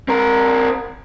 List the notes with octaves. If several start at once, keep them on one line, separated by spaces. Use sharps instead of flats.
C4 A#4